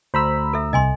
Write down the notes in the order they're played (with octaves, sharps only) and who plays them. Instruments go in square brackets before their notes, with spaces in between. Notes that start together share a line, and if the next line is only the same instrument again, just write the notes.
[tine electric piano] D2 A#5 E6 [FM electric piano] C5 B5
[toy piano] A4 E5
[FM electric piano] C2 [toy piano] D#5 G#5 C6